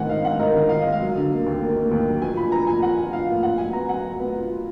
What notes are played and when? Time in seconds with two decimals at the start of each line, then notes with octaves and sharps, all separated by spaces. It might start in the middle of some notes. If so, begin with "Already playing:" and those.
Already playing: G#2 D#3 F#5 G#5
0.09 D#4 F5
0.24 G#2 F#5
0.39 D#4 A#4
0.55 D#3
0.69 D#4 F5
0.81 G#3 D#5
0.92 F5
1.01 F#3
1.15 D3
1.30 A#3
1.46 D#2
1.61 A#3
1.76 A#3
1.91 D#2
2.07 F#3
2.22 F3 G#5
2.37 A#2 B5
2.52 F3 A#5
2.67 A#2 G#5
2.82 F4 F#5
2.98 F4
3.13 F3 F5
3.28 A#2
3.43 F4 F#5
3.58 F#3 G#5
3.73 B3 A#5
3.89 F#3 F#5
4.04 F#3
4.19 B3
4.34 F4
4.50 F4